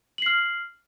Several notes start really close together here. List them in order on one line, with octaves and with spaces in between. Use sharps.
F#7 C7 F6